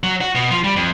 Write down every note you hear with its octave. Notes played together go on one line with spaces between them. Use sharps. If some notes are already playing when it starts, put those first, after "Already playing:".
F#3
F#4
B2
F3
G3
F2